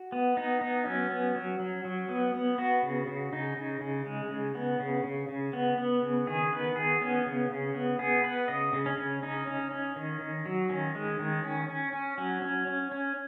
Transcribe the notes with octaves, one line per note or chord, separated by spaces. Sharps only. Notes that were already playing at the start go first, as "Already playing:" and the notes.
Already playing: F#4
B3
B3 D#4
B3 D#4
F#3 C#4
B3
F#3
F#3
F#3
B3
B3
B3 F#4
C#3
C#3
C#3 D#4
C#3
C#3
G#3
C#3
B3
C#3
C#3
C#3
B3
B3
C#3
D#3 G#4
B3 B4
D#3 G#4
B3 C#4
C#3
C#3
B3
B3 G#4
B3 B4
C#3 D#5
C#3
C#4
C#3
C#4 D#4
C#4
C#4
D#3
D#3
F#3
D#3 C#4
G#3
D#3
C#4
C#4
C#4
F#3 C#4
C#4
C#4
C#4